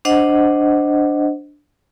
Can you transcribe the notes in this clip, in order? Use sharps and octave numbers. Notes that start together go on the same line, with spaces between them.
D4 C5 D#5 F#5